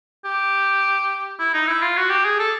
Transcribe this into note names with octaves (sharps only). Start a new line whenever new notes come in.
G4
E4
D#4
E4
F4
F#4
G4
G#4
A4